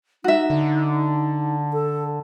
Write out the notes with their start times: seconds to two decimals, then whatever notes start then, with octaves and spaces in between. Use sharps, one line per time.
0.24 D#4 F#4 E5
0.50 D3
1.73 A4